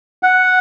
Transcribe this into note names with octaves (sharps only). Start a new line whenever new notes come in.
F#5